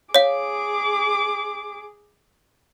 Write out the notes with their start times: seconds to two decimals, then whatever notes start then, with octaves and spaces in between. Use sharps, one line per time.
0.15 G#4 C#5 F5 D6